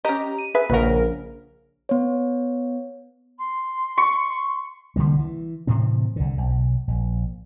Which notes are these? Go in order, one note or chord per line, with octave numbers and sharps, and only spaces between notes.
C#4 G4 D#5 A#5
D#7
G#4 B4 E5
A#1 C#3 A#4 B4 F#5
B3 C#5
C6
C#6
C2 D3 G3 A#3
E3
A2 C3 E3 C4
C2 D3
B1
A#1